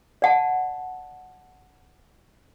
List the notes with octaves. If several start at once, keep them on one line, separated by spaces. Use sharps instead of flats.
D5 F#5 A5